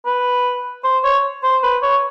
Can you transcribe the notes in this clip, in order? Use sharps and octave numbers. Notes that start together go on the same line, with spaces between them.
B4
C5
C#5
C5
B4
C#5